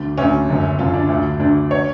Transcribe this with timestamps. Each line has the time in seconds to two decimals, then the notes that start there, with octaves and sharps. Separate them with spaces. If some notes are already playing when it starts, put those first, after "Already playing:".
Already playing: D2 D3 D4
0.18 D2 D3 C#4
0.49 F#1 F#2 D3
0.78 F#1 F#2 D3 F4
0.94 D4
1.09 D2
1.14 D3
1.40 D2 D3 D4
1.71 C#5